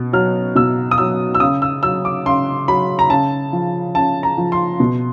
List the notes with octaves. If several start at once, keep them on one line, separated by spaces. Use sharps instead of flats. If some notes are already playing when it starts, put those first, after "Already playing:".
Already playing: B2
F#3 F6
B2 E6
D#6
F#3 E6
E6
C#3 D#6
E6
F#3 E6
D6
C#3 C6
F#3 B5
A#5
C#3 A5
F3
C#3 A5
A#5
F3
C6
B2